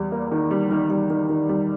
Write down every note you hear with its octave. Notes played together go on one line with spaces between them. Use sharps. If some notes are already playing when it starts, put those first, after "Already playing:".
Already playing: E2 G3
A#3
D#3
G3
D#3
G3
D#3
D#3
G3